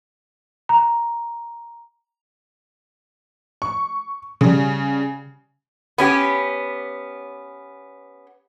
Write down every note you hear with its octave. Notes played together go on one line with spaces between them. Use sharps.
A#5
C#6
C#3 G3
B3 C#4 G4